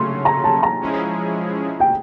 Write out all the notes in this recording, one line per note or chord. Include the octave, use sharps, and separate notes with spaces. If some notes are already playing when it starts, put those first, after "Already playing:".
Already playing: C#3 F#3 A3 C#4 C6
A#5
A5
A#5
F3 G#3 C#4 E4 G#4
G5